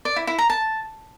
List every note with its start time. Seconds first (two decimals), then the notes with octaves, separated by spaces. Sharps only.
0.05 D5
0.16 E4
0.27 E4
0.39 A#5
0.50 A5